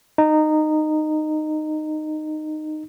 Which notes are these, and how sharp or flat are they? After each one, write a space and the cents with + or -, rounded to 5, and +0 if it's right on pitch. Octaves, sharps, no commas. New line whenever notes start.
D#4 -15